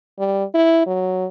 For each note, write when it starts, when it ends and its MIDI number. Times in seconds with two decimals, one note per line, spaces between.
0.19 0.44 55
0.54 0.84 64
0.87 1.26 54